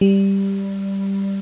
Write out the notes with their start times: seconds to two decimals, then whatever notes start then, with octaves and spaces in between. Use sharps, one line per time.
0.01 G3